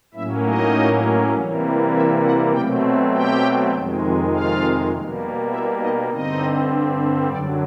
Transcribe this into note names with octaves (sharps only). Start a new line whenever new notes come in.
A2 F#3 A#3 C#4 E4 E5
D#4 D#5
C3 E3 G3 A#3
E4 E5
F#4 F#5
B2 F#3 A3 C4 G4 G5
G4 G5
F2 C3 D#3 G#3
F4 F5
B2 G3 A#3
E4 E5
D#4 D#5
G2 D3 G3 C4 D#4 D#5
F#2 D3 F#3 D4 D5